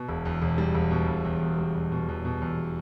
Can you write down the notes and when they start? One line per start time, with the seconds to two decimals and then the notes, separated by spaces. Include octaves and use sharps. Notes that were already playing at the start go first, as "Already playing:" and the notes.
Already playing: B2
0.08 E1
0.25 E2
0.42 E1
0.58 G3
0.75 E1
0.91 B2
1.08 E1
1.25 E2
1.41 E2
1.58 G3
1.75 E1
1.92 B2
2.08 E2
2.25 B2
2.42 E2